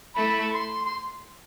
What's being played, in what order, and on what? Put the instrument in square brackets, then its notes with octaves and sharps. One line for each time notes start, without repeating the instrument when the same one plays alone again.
[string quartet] A3 E4 A4 [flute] B5
[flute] C6
C6